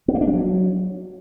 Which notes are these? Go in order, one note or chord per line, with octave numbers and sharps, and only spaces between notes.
B3
A#3
D4
G3
F#3